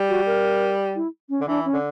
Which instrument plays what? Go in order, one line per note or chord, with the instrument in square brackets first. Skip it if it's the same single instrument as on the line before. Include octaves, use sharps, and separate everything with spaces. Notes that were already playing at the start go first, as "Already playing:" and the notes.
Already playing: [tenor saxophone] G3
[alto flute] F#4
A#4
E4
C#4
[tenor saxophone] D3
[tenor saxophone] E3 [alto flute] D4
[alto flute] C#4
[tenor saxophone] D3